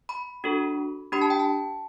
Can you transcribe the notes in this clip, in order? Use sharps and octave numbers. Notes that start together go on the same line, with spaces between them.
B5
D4 F#4 A4
D4 G4 B5
A5
G5
A5